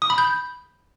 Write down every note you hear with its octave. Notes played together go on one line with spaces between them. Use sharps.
D#6
B5
G6